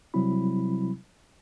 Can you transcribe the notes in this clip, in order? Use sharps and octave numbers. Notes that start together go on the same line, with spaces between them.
C3 F#3 G3 C4 E4 B5